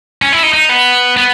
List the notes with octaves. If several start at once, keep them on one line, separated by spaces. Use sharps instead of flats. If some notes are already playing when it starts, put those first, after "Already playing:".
C#4
E4
D#4
D#4
B3
B3